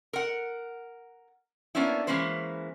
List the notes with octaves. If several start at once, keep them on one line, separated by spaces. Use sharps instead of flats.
A#4 F#5
A#3 B3 C#4 D4 E4
E3 G#3 A#3 C#4 B4 C5